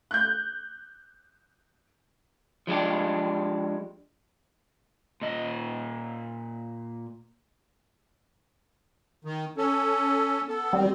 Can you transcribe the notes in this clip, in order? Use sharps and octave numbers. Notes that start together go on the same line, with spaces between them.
F#6 G6
F3 G#3 D4 G4
A#2 D#5
D#3
C#4 A4
B3 A4
D#3 G3 C4